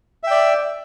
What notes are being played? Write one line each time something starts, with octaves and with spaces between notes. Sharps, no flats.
D5 E5 G5